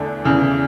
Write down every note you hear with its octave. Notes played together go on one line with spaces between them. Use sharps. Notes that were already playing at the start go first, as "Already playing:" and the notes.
Already playing: E2 D3 A3 D4
E2 C#3 E3